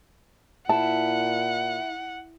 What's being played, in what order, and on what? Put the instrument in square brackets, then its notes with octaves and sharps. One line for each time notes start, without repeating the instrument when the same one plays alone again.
[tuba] A#2 [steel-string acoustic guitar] E4 [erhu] F#5 [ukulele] A5